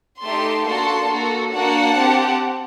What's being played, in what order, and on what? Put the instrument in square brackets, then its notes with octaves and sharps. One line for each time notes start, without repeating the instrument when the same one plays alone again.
[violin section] A3 D#4 G4 A5 C6
A#3 D4 F#4 A4 A5 C6
A#3 F#4 A4
A#3 D4 F#4 F#5 A5
C4 G4